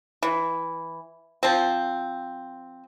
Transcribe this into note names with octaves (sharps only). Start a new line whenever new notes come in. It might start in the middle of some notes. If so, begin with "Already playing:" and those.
E3
F3 C4